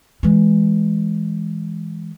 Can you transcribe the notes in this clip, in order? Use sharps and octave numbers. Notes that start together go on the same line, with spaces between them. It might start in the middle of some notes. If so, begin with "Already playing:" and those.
E3 G#3